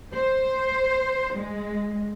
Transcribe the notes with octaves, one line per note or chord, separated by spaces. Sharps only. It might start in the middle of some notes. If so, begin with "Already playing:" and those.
C5
G#3